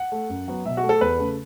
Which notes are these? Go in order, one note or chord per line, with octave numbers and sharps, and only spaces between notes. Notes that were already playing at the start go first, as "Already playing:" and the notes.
Already playing: F#5
A3
F#2
F#3 B3
B2 E5
F#4
A3
A4
E2 B4
C#3 A3